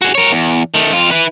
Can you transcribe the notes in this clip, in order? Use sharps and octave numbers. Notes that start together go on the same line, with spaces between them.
F#4 G#4
A#4 C#5
E2
D#3 A3
F2 F4
E4 B4